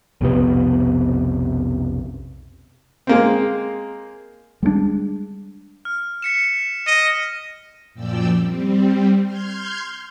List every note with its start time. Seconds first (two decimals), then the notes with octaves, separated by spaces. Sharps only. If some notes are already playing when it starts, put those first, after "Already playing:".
0.21 B1 F2 C3 B3
3.07 G#3 A#3 C4
4.63 G3 G#3 A#3 D4
5.85 F6
6.22 B6 C#7 E7
6.87 D#5
7.94 F#2 A#2 F3 D5 G5 E6
8.35 G3 C4
9.23 C6 F6 G6 G#6